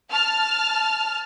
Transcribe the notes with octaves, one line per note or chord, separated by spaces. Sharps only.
A5 F6